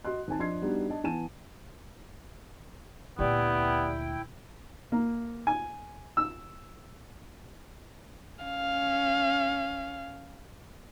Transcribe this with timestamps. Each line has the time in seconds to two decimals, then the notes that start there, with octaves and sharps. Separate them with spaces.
0.04 F#4 D#5 C6 F#6
0.28 D#2 C4 G#5 A5
0.39 F2 D4 D#5 C6 G#6 C7
0.62 G3 B3 D4 D#4 F#4 G4
0.89 D4 D#5 A5
1.04 E3 B3 G#5 A5 D#7 E7
3.19 D2 A#2 B3 E4 G4 D5 G5
4.92 A#3
5.47 G#5
6.17 E6
8.43 C#4 F5